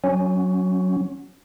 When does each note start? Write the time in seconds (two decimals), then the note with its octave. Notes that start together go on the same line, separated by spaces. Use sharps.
0.04 F#3 C#4